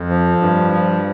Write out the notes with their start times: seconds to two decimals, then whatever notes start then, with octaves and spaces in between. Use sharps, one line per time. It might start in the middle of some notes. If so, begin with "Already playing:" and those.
Already playing: F2
0.09 F3
0.40 G2
0.72 F3